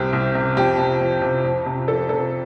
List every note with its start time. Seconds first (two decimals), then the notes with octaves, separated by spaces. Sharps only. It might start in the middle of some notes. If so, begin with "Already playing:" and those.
Already playing: C2 C3 G4
0.13 C2
0.35 C3
0.57 F2 G4
0.78 C3
1.01 F2
1.22 C3
1.44 F2
1.66 C3
1.88 F2 A4
2.09 C3 A4